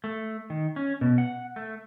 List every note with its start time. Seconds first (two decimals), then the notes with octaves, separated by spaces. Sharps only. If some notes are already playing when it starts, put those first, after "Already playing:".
0.04 A3
0.50 D#3
0.76 C#4
1.01 B2
1.18 F#5
1.56 A3